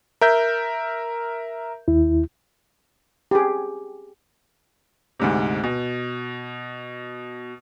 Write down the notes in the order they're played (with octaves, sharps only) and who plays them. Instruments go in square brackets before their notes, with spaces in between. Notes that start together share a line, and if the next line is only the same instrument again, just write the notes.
[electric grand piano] A#4 E5 G6
[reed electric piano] D#2 E4
[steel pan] G4 G#4
[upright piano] D2 G#2 C3
B2